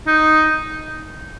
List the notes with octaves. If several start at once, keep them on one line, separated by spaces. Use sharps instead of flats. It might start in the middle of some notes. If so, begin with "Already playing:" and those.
D#4